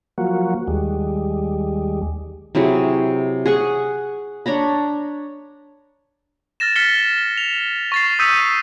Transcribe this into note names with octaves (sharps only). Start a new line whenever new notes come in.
F3 F#3 A#3 F#4
D#2 G3 G#3
C3 F#3 E4 G#4
G#4 F#5 C#6
D4 C#5 A#5 B5
F6 A6 A#6 E7
F6 A6 B6 C#7 G7
F7
C#6 A6 C7
D#6 E6 G6 B6 C#7 D#7